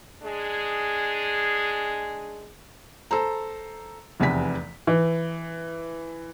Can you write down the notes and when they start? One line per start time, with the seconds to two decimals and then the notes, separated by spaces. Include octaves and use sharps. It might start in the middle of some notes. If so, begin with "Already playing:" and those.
0.23 G#3 D4 G#4
3.11 A4 C5 A#5
4.20 F1 E2 C3 B3 G#5 B6
4.87 E3